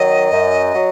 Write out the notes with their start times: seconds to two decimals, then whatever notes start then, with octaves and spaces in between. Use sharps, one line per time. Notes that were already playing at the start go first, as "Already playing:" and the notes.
Already playing: D#3 F#3 D#5
0.31 F#2
0.74 F#3